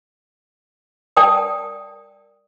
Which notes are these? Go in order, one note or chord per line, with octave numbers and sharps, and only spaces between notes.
A#4 D5 G5 A5 D#6